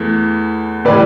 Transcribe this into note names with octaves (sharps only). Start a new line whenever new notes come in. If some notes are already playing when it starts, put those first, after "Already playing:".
Already playing: E2 E3 A3
A2 E3 G3 B4 D5